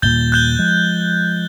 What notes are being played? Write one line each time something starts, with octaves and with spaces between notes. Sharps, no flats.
D#1 A#2 G6 A6 G7
F#6 G6 G7
F3 G#3